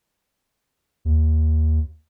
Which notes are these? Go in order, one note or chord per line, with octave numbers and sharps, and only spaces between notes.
D#2